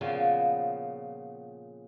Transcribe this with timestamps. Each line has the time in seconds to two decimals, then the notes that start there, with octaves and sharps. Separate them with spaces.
0.01 A#2 C#3 F3 B3 F4 F#4